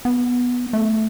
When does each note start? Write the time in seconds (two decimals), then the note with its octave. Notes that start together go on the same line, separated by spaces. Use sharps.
0.05 B3
0.73 A3